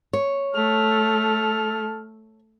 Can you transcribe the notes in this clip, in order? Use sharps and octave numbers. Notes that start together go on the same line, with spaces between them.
C#5
A3 A4 F6